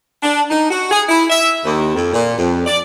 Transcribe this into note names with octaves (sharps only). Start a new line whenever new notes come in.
D4
D#4
F#4
G#4
E4
E5
D#2
F2
A#2
F2
D5